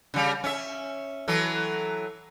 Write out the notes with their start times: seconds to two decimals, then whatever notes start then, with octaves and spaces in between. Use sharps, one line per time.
0.14 C#3 G3
0.44 C#4 E5
1.28 E3 F#3 A4